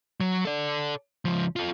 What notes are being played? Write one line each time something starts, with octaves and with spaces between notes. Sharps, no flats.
F#3
A4 D5
C#2 F3
F4 A4